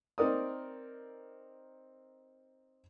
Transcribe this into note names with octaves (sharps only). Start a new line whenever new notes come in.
C4 D#4 A#4 D5 D#6